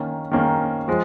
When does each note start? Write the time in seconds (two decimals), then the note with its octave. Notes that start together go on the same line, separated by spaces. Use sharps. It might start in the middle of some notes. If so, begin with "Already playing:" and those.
Already playing: D#3 A#3 C#4
0.31 D#3 A#3 C#4
0.88 F3 G#3